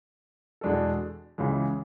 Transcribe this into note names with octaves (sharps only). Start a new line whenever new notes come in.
E2 B2 G#3 D4 A4
C#2 C#3 E3 G#3